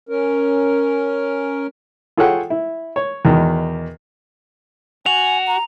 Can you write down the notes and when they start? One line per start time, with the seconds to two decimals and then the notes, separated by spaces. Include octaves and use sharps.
0.09 C#4 A#4
2.17 F4 G#4 A4 C#5 F#5 G5
2.50 E4
2.96 C#5
3.25 E2 B2 D#3
5.06 F#4 G#5 F7
5.48 A#5